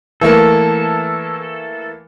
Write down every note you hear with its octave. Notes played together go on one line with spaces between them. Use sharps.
E3 A3 A#3 A4